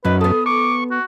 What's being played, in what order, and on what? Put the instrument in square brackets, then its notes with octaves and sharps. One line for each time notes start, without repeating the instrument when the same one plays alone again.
[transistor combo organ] F#2 [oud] F#3 D#4 [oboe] B4
[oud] B3 A4 [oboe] D#6
[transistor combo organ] C#6 [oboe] D6
[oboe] F#4